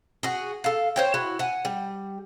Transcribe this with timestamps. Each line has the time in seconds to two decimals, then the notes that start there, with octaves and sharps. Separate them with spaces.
0.23 F#4 G#4
0.64 A4 F5
0.96 C5 C#5 G5
1.14 E4 F#4
1.39 F#5 G#5
1.65 G3